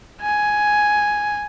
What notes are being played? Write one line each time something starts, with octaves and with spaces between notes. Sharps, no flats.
G#5